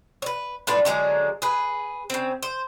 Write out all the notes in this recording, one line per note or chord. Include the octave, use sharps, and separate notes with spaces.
B4 C#5
A2 D4 F4 B4
D3 F#3 G#3 A#3
G#4 B4
C#3 C4
C5